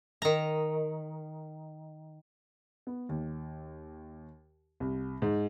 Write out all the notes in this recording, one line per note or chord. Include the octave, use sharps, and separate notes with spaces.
D#3 A#5
B3
D#2
C2
G#2